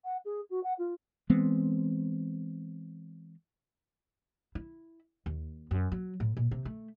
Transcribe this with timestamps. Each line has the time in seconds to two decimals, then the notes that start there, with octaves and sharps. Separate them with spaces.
0.04 F#5
0.25 G#4
0.50 F#4
0.63 F#5
0.78 F4
1.30 E3 G#3 B3 C4
4.55 E4
5.26 D#2
5.71 F#2
5.92 F#3
6.20 A2
6.37 A#2
6.51 C3
6.65 A3